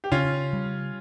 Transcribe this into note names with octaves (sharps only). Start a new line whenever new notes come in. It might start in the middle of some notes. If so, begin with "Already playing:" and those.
G4
C#3 C#4 F4
G3